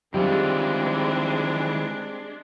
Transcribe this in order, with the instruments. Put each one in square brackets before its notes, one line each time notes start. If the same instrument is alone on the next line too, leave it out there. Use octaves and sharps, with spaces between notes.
[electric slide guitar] D#3 E3 F4 [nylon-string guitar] G3 [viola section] G#3 D4 [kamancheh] C4